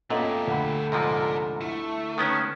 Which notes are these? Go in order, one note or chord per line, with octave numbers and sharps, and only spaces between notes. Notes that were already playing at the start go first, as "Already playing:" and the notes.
A#2 A3 B3 C#4 G4 A4 D#5
D2 A4 F#5 B5
G#2 C3 F3 A#4 D5
A3 E4
D#3 B3 C#4